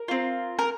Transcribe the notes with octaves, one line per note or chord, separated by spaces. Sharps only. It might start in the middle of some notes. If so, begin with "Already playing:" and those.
Already playing: A#4
C4 F4
A#4